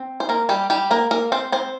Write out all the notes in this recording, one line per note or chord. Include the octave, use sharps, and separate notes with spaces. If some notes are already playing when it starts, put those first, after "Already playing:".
Already playing: C4
C5
A#3 A#4
G3 G4
G3 G4
A#3 A#4
A#3 A#4
C4 C5
C4 C5